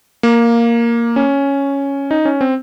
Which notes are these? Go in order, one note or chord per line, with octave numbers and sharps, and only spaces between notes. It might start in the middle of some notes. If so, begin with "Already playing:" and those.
A#3
C#4
D#4
C#4
C4